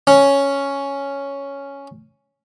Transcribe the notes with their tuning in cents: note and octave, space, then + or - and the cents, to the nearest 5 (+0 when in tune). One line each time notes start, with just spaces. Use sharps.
C#4 +5